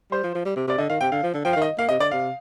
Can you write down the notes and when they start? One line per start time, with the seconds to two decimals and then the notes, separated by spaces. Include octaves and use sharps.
0.11 G3 C5
0.23 F3
0.35 F3
0.45 G3
0.56 C3
0.67 C3 D5
0.78 D3 D#5
0.89 D#3 F5
1.01 C3 G5
1.12 D3 F5
1.23 F3
1.34 D3
1.44 F3 G5
1.53 F5
1.56 D#3
1.62 D#5
1.78 A#3 F5
1.89 C3 D#5
2.00 D3 D5
2.11 C3 F5